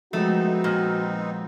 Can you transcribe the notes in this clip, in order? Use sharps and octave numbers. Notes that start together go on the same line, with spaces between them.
F3 G#3 A3 B3 C4 D#4 F#4
A#2